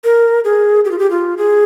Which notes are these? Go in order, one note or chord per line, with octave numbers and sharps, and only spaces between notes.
A#4
G#4
G4
F4
G4
F4
G#4